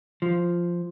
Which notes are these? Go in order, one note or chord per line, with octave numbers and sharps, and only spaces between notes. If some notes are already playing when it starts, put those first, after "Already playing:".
F3